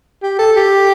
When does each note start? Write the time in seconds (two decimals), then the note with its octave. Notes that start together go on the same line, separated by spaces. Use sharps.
0.23 G4
0.39 A4
0.57 G4